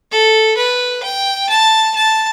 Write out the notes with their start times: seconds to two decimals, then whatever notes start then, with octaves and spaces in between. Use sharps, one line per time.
0.12 A4
0.57 B4
1.03 G5
1.49 A5
1.96 A5